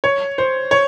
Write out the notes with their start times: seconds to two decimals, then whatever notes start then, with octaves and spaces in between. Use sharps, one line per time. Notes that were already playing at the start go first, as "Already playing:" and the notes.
0.04 C#5
0.38 C5
0.71 C#5